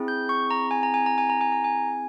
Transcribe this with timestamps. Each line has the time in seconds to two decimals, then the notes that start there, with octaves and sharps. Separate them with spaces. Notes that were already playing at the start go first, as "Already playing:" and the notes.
Already playing: C4 E4 G#4
0.08 G6
0.29 C#6
0.51 A#5
0.71 G#5
0.83 A#5
0.94 G#5
1.06 A#5
1.18 G#5
1.30 A#5
1.41 G#5
1.52 A#5
1.64 G#5